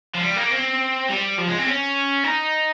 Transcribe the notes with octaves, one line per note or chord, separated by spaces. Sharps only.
F3
G3
A#3
C4
G3
F3
G#3
C4
C#4
D#4